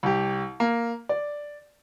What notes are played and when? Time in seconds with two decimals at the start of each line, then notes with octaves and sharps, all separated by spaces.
0.03 C2 G4
0.60 A#3
1.09 D5